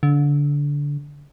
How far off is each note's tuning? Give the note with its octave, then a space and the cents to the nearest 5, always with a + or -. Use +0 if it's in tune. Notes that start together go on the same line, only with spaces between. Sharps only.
D3 -20